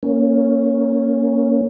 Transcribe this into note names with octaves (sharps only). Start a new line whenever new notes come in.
A#3 C#4